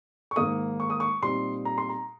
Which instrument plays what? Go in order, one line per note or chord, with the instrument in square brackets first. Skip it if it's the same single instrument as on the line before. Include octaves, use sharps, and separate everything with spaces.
[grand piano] C#6
G#2 D#3 A#3 D#6
C#6
D#6
C#6
A#2 G3 C4 D#4 C6
A#5
C6
A#5